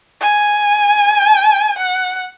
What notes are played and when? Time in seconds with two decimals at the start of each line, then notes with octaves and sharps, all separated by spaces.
0.21 G#5
1.78 F#5